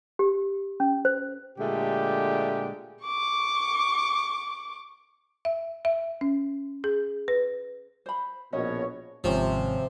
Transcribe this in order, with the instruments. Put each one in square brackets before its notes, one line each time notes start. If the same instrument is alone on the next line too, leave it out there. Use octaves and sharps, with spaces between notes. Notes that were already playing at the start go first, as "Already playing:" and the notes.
[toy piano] G4
C#4
C5
[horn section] A#2 D3 G#3 A3 G4
[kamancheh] C#6 D6
[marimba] E5
E5
C#4
G#4
B4
[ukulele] C5 B5
[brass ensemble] A#1 B2 C#5 [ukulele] C#4 F#4 D#5
[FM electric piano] G#1 C#4 G4 [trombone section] C3 [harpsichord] F3